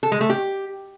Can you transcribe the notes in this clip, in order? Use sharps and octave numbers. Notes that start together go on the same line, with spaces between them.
A4
G#3
A3
G4